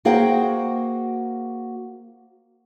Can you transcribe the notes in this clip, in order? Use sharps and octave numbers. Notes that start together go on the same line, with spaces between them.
A#3 F#4 G#4 C5 F#5 G5